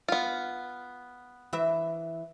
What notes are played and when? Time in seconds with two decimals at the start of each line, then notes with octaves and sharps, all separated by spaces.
0.08 B3 F4
1.53 E3 E5